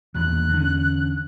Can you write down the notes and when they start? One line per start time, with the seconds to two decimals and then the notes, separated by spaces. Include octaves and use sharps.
0.14 D#1 A#1 E2 F#6
0.53 D3 C#4